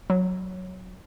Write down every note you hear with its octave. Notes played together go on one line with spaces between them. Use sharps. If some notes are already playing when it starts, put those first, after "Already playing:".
F#3